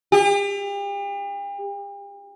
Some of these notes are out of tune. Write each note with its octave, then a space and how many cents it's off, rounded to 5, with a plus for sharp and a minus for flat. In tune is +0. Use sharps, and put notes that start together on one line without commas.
G4 +40